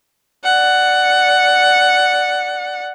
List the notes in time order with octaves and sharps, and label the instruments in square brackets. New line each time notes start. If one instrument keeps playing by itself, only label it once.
[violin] D5 F#5